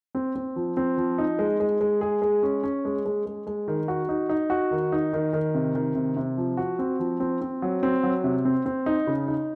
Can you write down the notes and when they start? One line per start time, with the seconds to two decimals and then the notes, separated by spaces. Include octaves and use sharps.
0.15 C4
0.35 C4
0.56 F3
0.77 C4
0.98 F3
1.18 D#4
1.39 G#3
1.60 G#3
1.81 G#3
2.01 G#4
2.22 G#3
2.43 C#4
2.63 C#4
2.85 G#3
3.05 G#3
3.26 G#3
3.47 G#3
3.68 D#3
3.88 F#4
4.09 D#4
4.29 D#4
4.50 F#4
4.71 D#3
4.92 D#4
5.13 D#3
5.33 D#3
5.54 C3
5.75 D#3
5.95 C3
6.16 C3
6.37 F3
6.57 F#4
6.79 C4
7.00 F3
7.20 C4
7.41 C4
7.62 F#3
7.83 C4
8.03 F#3
8.24 C3
8.45 C4
8.66 C4
8.86 D#4
9.07 C#3
9.28 D#4